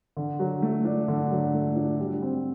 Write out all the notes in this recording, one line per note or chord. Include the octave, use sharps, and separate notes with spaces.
D3
F#3
A3
D4
D3
F#3
A3
D4
G3
C4